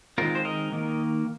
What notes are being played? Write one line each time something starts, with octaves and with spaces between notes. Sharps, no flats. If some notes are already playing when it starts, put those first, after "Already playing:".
D#3 G#3 C4 F4 A#4
C5
A#4 D#5
D#3 A#3